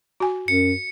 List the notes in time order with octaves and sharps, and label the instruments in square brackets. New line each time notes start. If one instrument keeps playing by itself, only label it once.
[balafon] F#4 G#5
[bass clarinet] F#2 [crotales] C#7